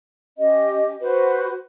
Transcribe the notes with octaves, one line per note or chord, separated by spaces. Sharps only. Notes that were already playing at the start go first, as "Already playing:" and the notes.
C#4 G4 D#5
F#4 B4 C5